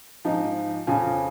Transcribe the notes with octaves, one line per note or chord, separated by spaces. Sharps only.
G#2 F3 D#4
F2 C#3 F3 C#4